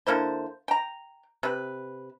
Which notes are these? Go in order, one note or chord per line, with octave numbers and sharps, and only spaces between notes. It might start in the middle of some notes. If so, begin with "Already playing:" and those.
D3 A#3 E4 C5
G5 A#5
C3 B4